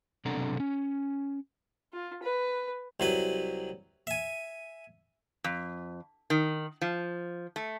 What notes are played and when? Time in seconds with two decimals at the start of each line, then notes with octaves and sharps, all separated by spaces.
0.25 B1 C3 D4 A4 F#5 A#5
0.60 C#4
1.93 F4
2.23 B4
3.00 C2 F#3 B4
4.07 E5 G#5
5.44 F2
6.30 D#3
6.81 F3
7.56 A3